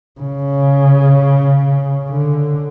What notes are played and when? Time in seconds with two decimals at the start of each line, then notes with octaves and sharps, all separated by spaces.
0.20 C#3
2.10 D3